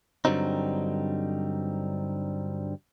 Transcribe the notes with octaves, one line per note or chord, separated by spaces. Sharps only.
G2 D3 F#3 G3 C4 D#4